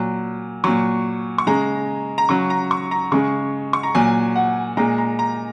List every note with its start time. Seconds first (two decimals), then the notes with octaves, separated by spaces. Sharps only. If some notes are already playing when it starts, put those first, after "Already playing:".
Already playing: A#2 F#3
0.64 A#2 F#3 C#6
1.38 C#6
1.47 C#3 G#3 A#5
2.18 A#5
2.29 C#3 F#3 C#6
2.50 A#5
2.71 C#6
2.91 A#5
3.12 C#3 G#3 C#6
3.73 C#6
3.83 A#5
3.95 A#2 F#3 G#5
4.36 F#5
4.77 A#2 G#3 A#5
4.98 A#5
5.19 A#5